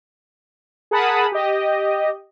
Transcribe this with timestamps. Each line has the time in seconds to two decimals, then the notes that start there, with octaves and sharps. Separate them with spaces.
0.91 G#4 A#4 F#5 A5 B5 D#6
1.32 G4 D#5